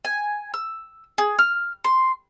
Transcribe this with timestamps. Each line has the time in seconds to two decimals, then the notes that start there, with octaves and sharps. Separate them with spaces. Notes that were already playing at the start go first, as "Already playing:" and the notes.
0.05 G#5
0.54 E6
1.18 G#4
1.39 F6
1.84 C6